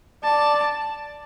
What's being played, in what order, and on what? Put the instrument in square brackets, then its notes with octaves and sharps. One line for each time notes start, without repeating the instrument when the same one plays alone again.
[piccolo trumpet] D5 [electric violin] A5